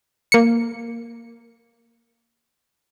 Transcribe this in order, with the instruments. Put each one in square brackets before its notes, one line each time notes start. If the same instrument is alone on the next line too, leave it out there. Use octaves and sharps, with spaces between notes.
[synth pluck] A#3 C#7